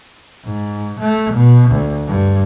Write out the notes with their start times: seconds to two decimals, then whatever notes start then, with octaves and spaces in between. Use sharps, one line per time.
0.45 G#2
1.00 A3
1.33 B2
1.71 D2
2.07 G2